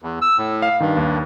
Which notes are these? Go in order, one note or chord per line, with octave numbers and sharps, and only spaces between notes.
E2
E6
A2
F5
G2 D#3
D#2